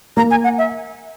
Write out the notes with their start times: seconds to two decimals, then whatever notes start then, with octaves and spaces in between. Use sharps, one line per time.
0.17 A#3 A#5
0.31 G#5
0.44 F#5
0.58 E5